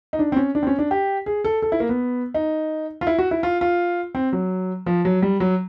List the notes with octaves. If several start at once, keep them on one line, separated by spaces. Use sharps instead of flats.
D#4
D4
C4
C#4
D4
C4
C#4
D4
G4
G#4
A4
A4
E4
A#3
B3
D#4
F4
E4
F#4
E4
F4
F4
C4
F#3
F3
F#3
G3
F#3